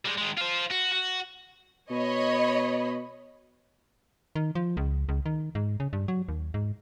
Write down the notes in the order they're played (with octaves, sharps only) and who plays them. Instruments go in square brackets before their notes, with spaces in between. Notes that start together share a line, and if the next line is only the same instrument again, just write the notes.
[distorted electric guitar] G3 G#3
D#3 G#3
F4 C5
F#4
F#4
[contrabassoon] B2 [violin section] C#5 D#5 B5
[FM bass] D#3
F3
C#2
C#2
D#3
G#2
C#3
G2
F#3
D#2
G#2